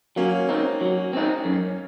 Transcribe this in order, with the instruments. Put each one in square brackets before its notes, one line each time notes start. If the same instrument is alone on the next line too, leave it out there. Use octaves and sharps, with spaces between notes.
[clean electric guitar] F#3 [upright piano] A#3 C#4
[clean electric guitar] C4 D#4
F#3
C4 D#4
F#2